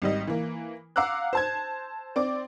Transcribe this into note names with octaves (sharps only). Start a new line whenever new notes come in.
G#1 G3 D#5
E3 A#3
F5 F#5 A#5 D6 E6 F#6
C5 A5 G#6
C4 D5 D6